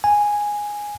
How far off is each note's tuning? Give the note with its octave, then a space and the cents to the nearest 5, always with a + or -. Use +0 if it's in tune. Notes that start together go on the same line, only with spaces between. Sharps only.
G#5 -5